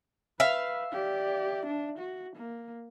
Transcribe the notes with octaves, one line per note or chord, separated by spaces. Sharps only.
B4 E5 F5
G4 D5
D4
F#4
A#3